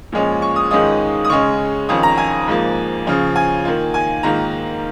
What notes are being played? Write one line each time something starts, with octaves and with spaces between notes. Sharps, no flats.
A#2 F3 G#3 C#4
C#6
D#6
G#2 D#3 G#3 C#4 F4 D#6
D#6
C#3 G#3 C#4 C#6
F2 D#3 C#4 F4 D#6
A#5
G#5
G#2 F3 A#3
C#3 F3 C#4 F4
G#5
D#3 A#3 F4
G#5
G#2 D#3 A#3 F4 A#5